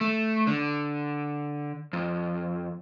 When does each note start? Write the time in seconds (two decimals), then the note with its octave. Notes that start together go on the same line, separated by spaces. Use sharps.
0.01 A3
0.47 D3
1.93 F2